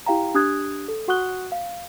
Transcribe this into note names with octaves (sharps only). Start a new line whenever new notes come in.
E4 G4 F5 G5 A#5
D4 G4 D#6 F#6 G#6
A4
F#4 F#5 C#6 D#6 F#6 G7
F5